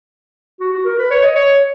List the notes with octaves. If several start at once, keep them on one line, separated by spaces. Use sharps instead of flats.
F#4
F#4
A#4
B4
C#5
D#5
C#5